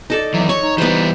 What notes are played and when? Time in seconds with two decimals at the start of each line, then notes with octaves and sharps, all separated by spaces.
0.10 D#4 A4 D5
0.34 D#2 E3 F#3
0.49 C#5 C#6
0.63 D#4
0.78 E3 G3 B3 C5